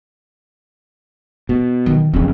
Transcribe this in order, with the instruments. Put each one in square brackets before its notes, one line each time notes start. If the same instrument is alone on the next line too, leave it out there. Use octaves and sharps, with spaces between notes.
[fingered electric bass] B2
[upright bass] D#3
[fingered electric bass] F2 C#3 [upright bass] C4 D4